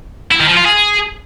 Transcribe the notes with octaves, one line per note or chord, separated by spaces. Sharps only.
E4
D#3
F3
F4
G#4